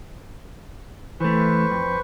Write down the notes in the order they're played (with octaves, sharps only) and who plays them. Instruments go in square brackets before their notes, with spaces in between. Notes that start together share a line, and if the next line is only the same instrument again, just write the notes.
[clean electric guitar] E3 A3 [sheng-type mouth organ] B4 C5 C#6
[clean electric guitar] F2